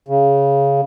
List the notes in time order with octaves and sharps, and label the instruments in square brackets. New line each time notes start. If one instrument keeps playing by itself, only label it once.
[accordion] C#3